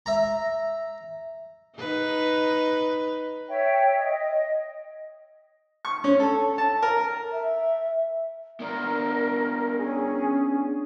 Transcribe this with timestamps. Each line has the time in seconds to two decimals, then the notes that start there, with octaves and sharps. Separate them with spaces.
0.06 E5 A#5
1.77 D#4 B4
3.48 C#5 E5 G5
3.98 D#5
5.85 C#6
6.04 C#4
6.20 A4
6.58 A5
6.82 A#4
7.32 E5
8.60 B3 D4 A#4 D5
9.78 C#4 G#4